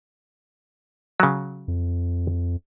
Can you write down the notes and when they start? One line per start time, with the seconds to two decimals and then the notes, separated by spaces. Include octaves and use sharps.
1.20 C#3 F#3
1.68 F2